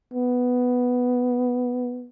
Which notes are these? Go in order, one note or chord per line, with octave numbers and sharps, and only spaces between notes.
B3